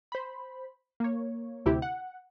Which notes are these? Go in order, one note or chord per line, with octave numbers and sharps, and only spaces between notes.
C5 B5
A#3 C#5
D2 C3 E4 G4
F#5